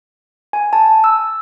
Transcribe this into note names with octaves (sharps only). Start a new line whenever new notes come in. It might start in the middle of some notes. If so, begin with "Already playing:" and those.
G#5
A5
E6